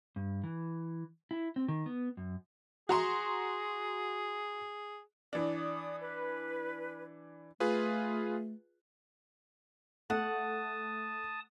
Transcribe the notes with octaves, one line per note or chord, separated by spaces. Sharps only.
G2
E3
E4
C4
D#3
B3
F#2
F#4 G#4 A#5 C6
E3 D4 D5 D#6
B4
A3 F4 G#4 B4
A3 F#5 A5 D#6